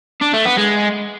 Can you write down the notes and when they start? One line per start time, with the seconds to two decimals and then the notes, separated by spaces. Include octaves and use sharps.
0.22 D4
0.34 A3
0.46 B3
0.57 G#3